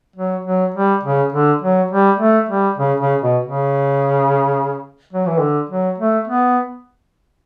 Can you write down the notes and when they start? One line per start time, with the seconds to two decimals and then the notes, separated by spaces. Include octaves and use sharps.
0.16 F#3
0.45 F#3
0.74 G3
1.03 C#3
1.32 D3
1.62 F#3
1.91 G3
2.19 A3
2.49 G3
2.78 C#3
3.00 C#3
3.22 B2
3.44 C#3
5.13 F#3
5.27 E3
5.40 D3
5.69 F#3
5.98 A3
6.28 B3